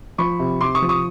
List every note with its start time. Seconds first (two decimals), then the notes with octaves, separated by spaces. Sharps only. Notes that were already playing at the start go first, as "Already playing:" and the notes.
0.18 F3 B5 C#6
0.39 C3
0.61 C3 C6 D6
0.75 C#6 D#6
0.82 F3
0.89 C#6 D#6